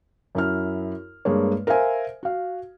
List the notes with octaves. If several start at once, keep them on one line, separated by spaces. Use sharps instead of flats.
F#2 E4 F6
G2 G#3 A#3 C#5
A#4 C5 E5 F5 G#5
F#4 F5